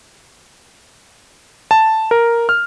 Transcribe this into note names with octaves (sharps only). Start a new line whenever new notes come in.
A5
A#4
F6